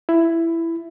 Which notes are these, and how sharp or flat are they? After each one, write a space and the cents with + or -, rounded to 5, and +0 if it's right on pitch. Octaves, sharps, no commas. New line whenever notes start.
E4 +10